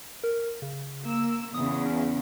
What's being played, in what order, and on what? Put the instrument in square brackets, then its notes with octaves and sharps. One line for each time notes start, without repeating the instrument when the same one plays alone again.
[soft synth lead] A#4
C#3
[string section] A#3 E6
[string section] E2 C#3 [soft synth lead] D#6
[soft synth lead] C#4